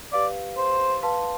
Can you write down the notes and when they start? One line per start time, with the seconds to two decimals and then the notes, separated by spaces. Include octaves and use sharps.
0.13 G4 B4 D5 F5
0.57 C5
1.03 B4 F5 A5 C6